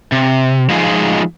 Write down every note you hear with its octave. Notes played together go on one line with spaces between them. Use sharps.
C3
F3 G#3 A3 D#4 F4 G#4